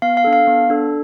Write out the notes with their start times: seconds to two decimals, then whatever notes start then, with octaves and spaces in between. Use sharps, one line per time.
0.02 B3 F5
0.17 F5
0.24 D4 A4
0.33 F5
0.47 B3
0.70 D4 A4